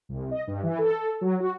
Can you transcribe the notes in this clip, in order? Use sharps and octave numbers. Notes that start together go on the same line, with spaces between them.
C2
D#5
G2
E3
A4
F#3
F#4